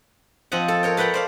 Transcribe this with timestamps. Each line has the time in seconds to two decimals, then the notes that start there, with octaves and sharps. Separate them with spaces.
0.52 F3 C4 D#5 F#5
0.68 A4
0.83 A#4 C#5 G5
0.97 A4 B4 F#5 G5 A#5
1.14 C5 D5 F5